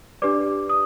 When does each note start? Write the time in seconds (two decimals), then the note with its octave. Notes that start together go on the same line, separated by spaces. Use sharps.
0.22 D4 G4 B4 D5 D6
0.69 D#6